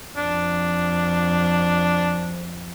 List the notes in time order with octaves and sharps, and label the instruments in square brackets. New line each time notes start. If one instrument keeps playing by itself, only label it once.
[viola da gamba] F2 [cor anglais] D4